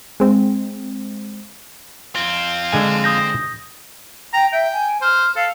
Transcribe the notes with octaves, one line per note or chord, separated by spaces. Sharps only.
G#3 C4
F2 C4 F4
D3 G#3 G#5
D#6 G6 A#6
G5 A#5
E5 G5
G#5
C5 F6
A4 F5